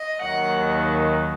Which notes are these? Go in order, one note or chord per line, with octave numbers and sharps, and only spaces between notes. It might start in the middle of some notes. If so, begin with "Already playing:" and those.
Already playing: D#5
D#2 D#3 F#3 F#5